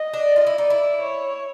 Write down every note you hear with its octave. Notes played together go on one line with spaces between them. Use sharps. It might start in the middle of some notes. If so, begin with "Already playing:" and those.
Already playing: D#5
D4
F4
E4
D#4 D5
E4
C#5